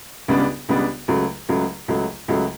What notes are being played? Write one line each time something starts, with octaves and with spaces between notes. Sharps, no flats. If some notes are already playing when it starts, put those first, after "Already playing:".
C#2 C#3 G3 B3 D4
C#2 C#3 G3 B3 D4
C#2 C#3 F#3 A3
C#2 C#3 F#3 A3
C#2 C#3 F#3 A3
C#2 C#3 F#3 A3